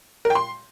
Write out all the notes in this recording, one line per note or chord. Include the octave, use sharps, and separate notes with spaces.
A#4
G5
C6